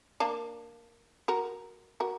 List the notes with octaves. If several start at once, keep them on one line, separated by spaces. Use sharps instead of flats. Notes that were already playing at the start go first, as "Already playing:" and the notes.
A#3 D4
F#4 A#4
F#4 A#4